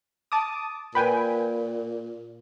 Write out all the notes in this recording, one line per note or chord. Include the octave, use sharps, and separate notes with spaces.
A5 D6 D#6
A#2 B4 G5 G#5